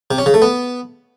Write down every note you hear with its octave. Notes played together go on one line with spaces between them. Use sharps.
C3
C#4
C#3
A3
B3